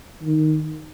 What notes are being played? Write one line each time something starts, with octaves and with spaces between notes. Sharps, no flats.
D#3